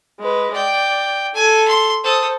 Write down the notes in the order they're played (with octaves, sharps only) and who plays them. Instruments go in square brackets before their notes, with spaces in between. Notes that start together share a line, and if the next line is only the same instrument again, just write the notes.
[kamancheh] G#3 B4
[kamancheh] D5 [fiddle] G5
[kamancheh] A4 [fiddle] G#5
[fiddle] C6
[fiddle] A4 D#6 [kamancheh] C5